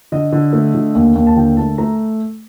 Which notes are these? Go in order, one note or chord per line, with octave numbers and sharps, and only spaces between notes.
D3 D#5
D3
A3
D3
D#2
D#2
A5
D3 G5
A3 A5
A3 A#5